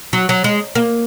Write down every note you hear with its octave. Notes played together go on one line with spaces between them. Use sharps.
F#3
F#3
G#3
A#3